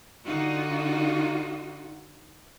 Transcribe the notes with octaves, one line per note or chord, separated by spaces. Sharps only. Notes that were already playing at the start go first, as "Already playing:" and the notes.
D3 D#4 F4 F#4